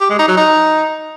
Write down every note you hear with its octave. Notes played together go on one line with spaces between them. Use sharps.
G4
G#3
D#4
F#3
D#4